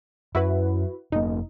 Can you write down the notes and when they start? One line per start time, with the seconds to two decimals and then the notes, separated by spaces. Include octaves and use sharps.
0.35 F#2 E4 F#4 B4
1.12 F1 B2 A#3 D#4